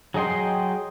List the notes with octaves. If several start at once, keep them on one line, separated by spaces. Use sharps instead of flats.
F#3 G#4 D#5 G5 C6